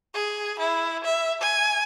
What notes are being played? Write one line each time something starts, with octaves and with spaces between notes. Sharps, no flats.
G#4
E4
E5
G#5